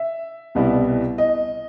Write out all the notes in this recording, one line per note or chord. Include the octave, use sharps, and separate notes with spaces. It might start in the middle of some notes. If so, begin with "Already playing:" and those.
Already playing: E5
C2 B2 G3 B3 E4
D#5